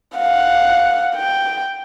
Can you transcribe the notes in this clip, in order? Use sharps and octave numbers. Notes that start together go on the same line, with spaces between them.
F5 F#5
G5